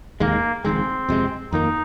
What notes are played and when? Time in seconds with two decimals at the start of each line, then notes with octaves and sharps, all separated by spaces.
0.20 F1 D#2 D#3 G#3 A#3
0.64 F1 D#2 D#3 G#3 C4
1.09 F2 C3 G#3
1.52 F2 D#3 A#3 D#4